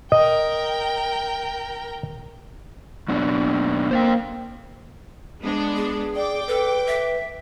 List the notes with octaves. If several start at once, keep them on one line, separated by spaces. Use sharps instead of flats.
A#4 D#5 G5
F#2 B2 D4
A#3 C5 F5 G5
G#3 B3 D4
G#4
D5 G5 D6
A4 B4
E5